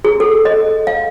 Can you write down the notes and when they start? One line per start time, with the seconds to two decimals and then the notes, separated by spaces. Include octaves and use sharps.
0.05 G#4
0.20 A4
0.45 D#5
0.87 F5